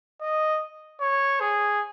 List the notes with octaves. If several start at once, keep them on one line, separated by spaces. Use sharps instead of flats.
D#5
C#5
G#4